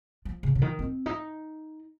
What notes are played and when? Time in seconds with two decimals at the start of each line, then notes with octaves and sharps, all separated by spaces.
0.25 F3
0.43 C#3
0.55 C#3
0.62 D#3
0.79 C4
1.06 D#4